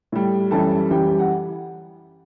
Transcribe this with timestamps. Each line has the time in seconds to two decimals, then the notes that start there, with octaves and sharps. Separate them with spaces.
0.12 A2 G3
0.51 F#2 E3 G3 A4 A5
0.90 F#2 E3 G3 G4 G5
1.19 F#5